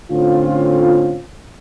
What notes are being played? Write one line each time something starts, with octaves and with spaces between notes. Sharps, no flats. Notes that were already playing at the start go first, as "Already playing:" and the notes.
A2 D3 C4 C#4 F4